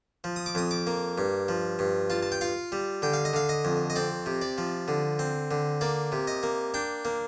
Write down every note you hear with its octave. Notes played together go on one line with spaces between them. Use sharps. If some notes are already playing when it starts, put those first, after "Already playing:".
F3
D#6
D6
F2 D#6
D6
A#3
G2
F3
G2
F4 A5
A5
G5
F4 F5
G3
D3 G5
F5
D#5
D3 F5
D#5
F2
D#5
C4 D5
C3
D5
F3
D3
C4
D3
A#3 D5
C3
D#5
A#3
D4 G5
A#3